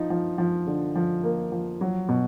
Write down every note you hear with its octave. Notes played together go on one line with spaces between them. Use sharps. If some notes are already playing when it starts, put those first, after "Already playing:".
Already playing: F3 D#4
F3
F3
D3
F3
A#3
F3
F#3
B2